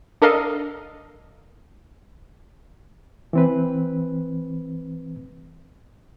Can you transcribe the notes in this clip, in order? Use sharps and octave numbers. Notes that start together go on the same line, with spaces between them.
D4 A4 A#4 D#5 F5
E3 C4 B4